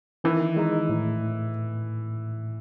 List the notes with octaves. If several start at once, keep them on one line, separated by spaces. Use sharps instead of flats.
D#3 E3
G#3 D#4
A2